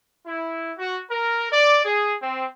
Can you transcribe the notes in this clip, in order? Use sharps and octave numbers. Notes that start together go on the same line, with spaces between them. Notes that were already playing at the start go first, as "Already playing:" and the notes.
E4
F#4
A#4
D5
G#4
C4